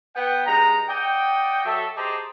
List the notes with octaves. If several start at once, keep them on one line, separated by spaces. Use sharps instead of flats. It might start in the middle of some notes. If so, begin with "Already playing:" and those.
B3 F#5 G5
G2 G#3 D#4 G5 A#5
D5 D#5 F#5 G5
F#3 A4 E5
G4 G#4 C5 D#5 A5 A#5